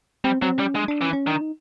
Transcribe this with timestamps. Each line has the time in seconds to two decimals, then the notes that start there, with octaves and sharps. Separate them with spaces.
0.24 G3 C4
0.42 F#3 C4
0.59 G3 C#4
0.75 G#3 D4
0.88 D4
1.01 E3 C#4
1.13 C#4
1.27 D#3 D4
1.41 D#4